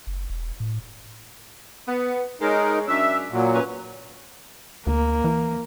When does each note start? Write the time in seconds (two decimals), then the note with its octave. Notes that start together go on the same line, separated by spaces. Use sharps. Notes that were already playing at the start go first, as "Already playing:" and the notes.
0.07 F#1
0.30 E1
0.60 A2
1.87 B3
2.41 G#3 D#4 A#4 C#5
2.88 F#2 C#4 D4 E5
3.32 A#2 F#3
3.53 F#2 C#4 B4
4.87 D2 A#3
5.24 E3